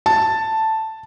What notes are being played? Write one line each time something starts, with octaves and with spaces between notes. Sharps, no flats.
A5